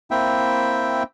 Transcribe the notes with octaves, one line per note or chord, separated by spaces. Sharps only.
A#3 C4 E4 E5 G5